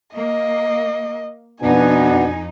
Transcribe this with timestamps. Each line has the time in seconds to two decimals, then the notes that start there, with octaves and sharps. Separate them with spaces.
0.15 A#3 D#5
1.62 F2 B2 B3 D4 D#4 G#5